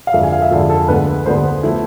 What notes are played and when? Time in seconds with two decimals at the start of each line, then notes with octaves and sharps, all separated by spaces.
0.07 F5
0.13 F2 D3 G#3 E5
0.23 G#5
0.32 F5
0.42 E5
0.51 F2 D3 G#3 A4
0.70 A4
0.88 D2 D3 G#3 B3 B4
1.26 D2 D3 G#3 B3 C5
1.63 F3 A3 E4